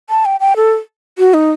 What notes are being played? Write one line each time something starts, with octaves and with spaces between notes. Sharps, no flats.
A5
G5
G5
A4
F#4
D#4